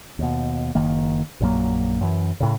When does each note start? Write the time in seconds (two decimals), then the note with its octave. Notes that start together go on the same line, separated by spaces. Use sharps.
0.19 D#2 B2
0.75 F#1 D#3 A#3
1.40 A#1 F#2 F#3 A#3
2.01 F#2 E3
2.40 A2 C#3